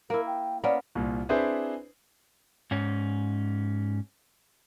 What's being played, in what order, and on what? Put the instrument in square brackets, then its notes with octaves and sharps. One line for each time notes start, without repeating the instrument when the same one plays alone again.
[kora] A#3 E4 [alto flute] A#4
[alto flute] G5
[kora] A#3 B3 C#4 [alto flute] D5
[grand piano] C2 A#2
C4 D4 E4 G#4 B4 C5
[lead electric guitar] G#2 C#4